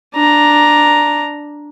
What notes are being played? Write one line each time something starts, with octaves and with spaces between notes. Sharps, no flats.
D4 A#5